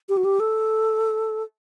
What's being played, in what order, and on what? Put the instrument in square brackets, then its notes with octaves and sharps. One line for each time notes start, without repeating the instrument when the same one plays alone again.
[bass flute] G4
F#4
G4
A4